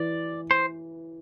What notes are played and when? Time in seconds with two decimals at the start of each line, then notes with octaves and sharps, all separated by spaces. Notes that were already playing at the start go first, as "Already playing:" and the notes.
Already playing: E3 D5
0.51 C5